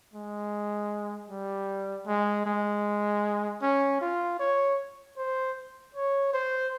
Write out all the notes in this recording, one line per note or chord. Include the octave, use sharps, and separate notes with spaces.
G#3
G3
G#3
G#3
C#4
F4
C#5
C5
C#5
C5